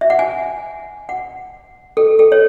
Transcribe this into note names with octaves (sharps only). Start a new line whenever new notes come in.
E5
F#5
G#5
F#5
A4
A4
C#5